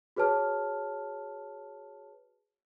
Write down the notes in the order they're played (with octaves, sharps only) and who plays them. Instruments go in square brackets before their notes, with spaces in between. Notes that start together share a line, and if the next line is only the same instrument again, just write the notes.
[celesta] F#4 G#4 B4 C#5 A5 F6